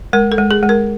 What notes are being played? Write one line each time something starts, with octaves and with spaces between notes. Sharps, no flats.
G#3 A#4
A4
G#3
G#4
G#3
A#4